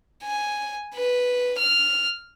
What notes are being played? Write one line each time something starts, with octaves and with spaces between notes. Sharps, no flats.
G#5
B4
F6